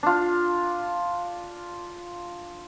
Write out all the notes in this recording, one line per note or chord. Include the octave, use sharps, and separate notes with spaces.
D4 F4